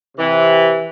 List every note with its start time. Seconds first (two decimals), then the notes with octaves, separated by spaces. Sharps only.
0.18 C3 E3